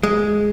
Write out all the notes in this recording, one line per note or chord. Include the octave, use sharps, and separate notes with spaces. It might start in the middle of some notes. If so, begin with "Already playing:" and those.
G#3